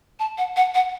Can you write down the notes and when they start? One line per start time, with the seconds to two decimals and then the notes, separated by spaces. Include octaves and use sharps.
0.19 A5
0.38 F#5
0.56 F#5
0.74 F#5